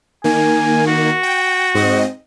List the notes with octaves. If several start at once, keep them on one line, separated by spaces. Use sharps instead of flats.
D#3 A#3 G#5
F#4
G5
G#2 C4 D#5